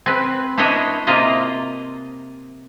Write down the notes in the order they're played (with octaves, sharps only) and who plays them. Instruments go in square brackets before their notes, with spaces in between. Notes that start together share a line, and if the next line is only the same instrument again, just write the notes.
[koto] C4 B4
B3 D4 E4 C5 C#5 D#5
C3 A#3 F4 D#5 E5